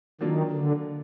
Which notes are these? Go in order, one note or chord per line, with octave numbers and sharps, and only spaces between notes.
D#3 F#3 A#3 D4 F4
D3